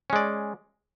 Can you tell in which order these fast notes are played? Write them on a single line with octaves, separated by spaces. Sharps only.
C#4 G#3 D5